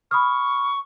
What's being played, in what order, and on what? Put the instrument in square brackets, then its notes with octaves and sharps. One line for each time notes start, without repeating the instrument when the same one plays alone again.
[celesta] B5 D#6 F6 [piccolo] C#6